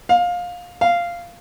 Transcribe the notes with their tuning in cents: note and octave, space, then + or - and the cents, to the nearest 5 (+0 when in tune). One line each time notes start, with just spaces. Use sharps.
F5 +20
F5 -10